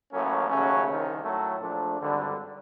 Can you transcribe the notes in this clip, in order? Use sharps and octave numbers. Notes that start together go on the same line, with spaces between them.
A1 A2 F#3 A#3 C#4
D#2 C#3 F#3 A3 C#4
C2 C3 D#3
A2 F#3 A3
A#1 A#2 F3 A3 D4
G#1 G2 D3 G3